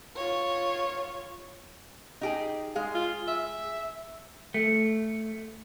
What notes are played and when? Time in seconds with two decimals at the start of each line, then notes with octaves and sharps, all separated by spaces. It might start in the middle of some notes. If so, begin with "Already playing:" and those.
0.16 F4 C#5
2.21 D#4 G4 G#4
2.75 G#3 G#4 F5
2.95 F4
3.28 E5
4.54 A3